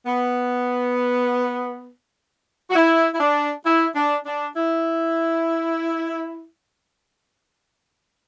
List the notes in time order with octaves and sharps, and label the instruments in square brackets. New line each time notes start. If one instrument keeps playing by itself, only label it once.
[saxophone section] B3
F#4
E4
E4
D4
E4
D4
D4
E4